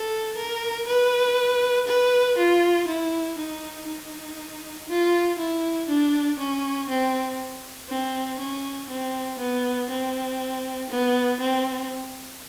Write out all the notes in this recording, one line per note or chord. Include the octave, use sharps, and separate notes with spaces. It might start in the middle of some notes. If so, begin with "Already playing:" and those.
Already playing: A4
A#4
B4
B4
F4
E4
D#4
D#4
F4
E4
D4
C#4
C4
C4
C#4
C4
B3
C4
B3
C4